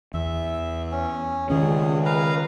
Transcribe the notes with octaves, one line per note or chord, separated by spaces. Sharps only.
E2 E5
C#4
C#2 D#3 C#4 G#4
B4 F5 A#5